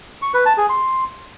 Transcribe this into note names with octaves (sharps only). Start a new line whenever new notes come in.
C#6
B4
A5
G#4
C6